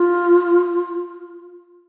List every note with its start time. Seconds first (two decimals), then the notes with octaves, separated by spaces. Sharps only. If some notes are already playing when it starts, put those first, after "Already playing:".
Already playing: F4